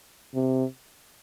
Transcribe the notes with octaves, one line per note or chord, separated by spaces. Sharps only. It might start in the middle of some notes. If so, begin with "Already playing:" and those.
C3